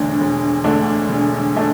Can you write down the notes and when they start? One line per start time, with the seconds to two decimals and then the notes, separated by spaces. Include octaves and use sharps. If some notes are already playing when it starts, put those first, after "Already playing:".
Already playing: E1 D2 D3 A3 D4
0.20 E1
0.64 D2 D3 A3 D4
1.09 E1
1.55 D3 A3 D4